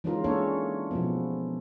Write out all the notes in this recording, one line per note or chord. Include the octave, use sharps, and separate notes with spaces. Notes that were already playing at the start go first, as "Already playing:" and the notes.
E3 G#3 C#4 D#4 F4 A#4
G#3 A#3 C#4 D4 A4 C#5
B2 F3 B3